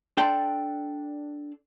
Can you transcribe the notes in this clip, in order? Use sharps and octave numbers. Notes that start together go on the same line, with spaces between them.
D4 A4 D5 G5 A5 C6